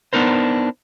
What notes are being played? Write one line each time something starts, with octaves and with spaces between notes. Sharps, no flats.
B3 D4 D#4 A#4 C5